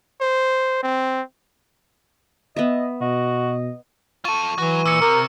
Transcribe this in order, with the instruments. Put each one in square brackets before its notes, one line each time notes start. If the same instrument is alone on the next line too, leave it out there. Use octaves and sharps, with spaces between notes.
[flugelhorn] C5
C4
[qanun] B3 E5 [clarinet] D#5
[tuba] B2 [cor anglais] F#4 [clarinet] D#5
[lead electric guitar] F4 A4 [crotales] C#6 D#7
[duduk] E3 [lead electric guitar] F#3 F#4
[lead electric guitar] A#2 [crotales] E6 C#7
[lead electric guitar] C3 [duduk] A#4